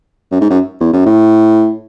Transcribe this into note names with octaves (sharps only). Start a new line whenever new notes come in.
F#2
G#2
F#2
E2
F#2
A2